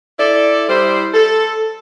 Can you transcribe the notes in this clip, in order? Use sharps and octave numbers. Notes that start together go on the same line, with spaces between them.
E4 A4 D5
G3 E4 C5
A4